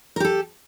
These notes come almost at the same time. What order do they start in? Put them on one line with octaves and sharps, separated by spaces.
A#4 G4 A4